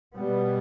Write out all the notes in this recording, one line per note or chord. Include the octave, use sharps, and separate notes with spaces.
B2 G3 B3